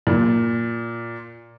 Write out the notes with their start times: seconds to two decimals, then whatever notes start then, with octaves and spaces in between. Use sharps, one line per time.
0.07 A#2